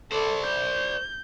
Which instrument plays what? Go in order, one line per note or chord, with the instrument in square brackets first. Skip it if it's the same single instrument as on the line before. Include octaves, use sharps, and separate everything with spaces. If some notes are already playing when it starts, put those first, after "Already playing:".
[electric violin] A4 [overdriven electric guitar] C5 D5
[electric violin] G6